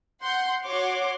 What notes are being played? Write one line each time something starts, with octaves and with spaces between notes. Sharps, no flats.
F#5 C6 G6
F#4 C#5 C6 D6